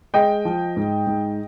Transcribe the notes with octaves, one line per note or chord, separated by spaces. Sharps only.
G#3 D#5 G5
F3
G#2
G#2